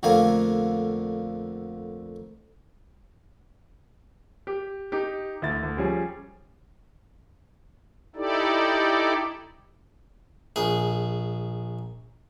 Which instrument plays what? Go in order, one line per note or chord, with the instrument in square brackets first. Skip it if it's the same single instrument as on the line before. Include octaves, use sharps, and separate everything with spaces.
[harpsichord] F2 D3 A3 A#3 F5 G#5
[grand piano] G4
D#4 G4
D2 E4 A6
D2
F3 G3 C#4 G#4
[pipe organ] D#4 E4 G4 A4 D5
[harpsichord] A#1 G#4